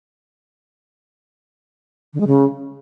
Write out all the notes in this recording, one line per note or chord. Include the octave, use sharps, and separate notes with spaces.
D3
G#3
C#3